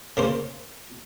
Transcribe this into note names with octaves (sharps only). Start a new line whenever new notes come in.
C#3 A#3 C5